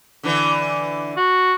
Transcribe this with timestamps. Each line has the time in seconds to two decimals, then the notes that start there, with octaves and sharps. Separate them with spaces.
0.23 D3 E3
1.16 F#4